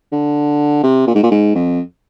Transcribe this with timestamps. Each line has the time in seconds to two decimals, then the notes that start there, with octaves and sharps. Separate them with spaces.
0.12 D3
0.83 C3
1.07 A#2
1.15 G#2
1.23 A#2
1.31 G#2
1.55 F2